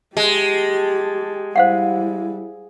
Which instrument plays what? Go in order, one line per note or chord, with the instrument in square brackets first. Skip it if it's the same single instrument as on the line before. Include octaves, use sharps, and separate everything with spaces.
[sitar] G#3 [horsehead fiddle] G4 A5
[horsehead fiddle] G3 E4 [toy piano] C5 F5 F#5